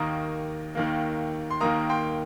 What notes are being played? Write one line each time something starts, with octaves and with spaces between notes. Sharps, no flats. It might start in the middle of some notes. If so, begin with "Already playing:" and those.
Already playing: D#2 D#3 A#3 A#5 D#6
D#2 D#3 A#3
C6
D#2 D#3 A#3 A#5 D#6
G5 C6